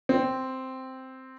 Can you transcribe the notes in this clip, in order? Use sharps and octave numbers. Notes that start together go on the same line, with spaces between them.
C4